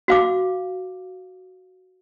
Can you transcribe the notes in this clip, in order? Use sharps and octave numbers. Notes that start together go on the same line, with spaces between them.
F#4 F5 D6